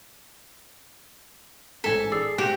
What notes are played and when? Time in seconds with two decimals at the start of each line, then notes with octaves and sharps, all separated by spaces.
1.84 A1 G#2 A4 G#5 B6
2.12 G#4 D5 E6 C7
2.38 G#2 F#4 G4